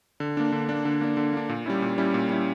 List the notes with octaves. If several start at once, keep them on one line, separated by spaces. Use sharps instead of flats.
D3
A#3 D4
D3
A#3 D4
D3
A#3 D4
D3
A#3 D4
A#2
G3 C#4 E4
A#2
G3 C#4 E4
A#2
G3 C#4 E4